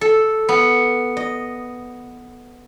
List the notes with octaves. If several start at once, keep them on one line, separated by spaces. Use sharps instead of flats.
A4
B3
D#5